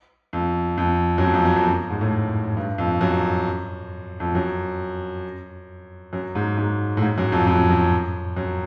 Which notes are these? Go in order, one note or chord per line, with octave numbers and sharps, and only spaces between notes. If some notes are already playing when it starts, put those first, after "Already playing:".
F2
F2
F#2
F2
F2
F#2
F2
F#2
G#2
A2
G2
F2
F#2
F2
F#2
F#2
G#2
G#2
A2
G#2
F#2
F2
F2
F#2
F#2